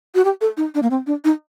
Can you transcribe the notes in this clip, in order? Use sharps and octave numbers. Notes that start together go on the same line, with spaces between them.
F#4
G4
A4
D#4
D4
A#3
C4
D4
D#4